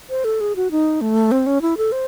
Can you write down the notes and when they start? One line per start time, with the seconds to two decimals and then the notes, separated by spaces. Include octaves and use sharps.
0.10 C5
0.24 A4
0.41 G#4
0.56 F#4
0.71 D#4
1.01 A3
1.32 C4
1.46 C#4
1.62 E4
1.77 A4
1.92 C5